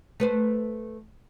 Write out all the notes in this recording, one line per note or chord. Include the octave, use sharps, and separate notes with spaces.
A3 B4 C5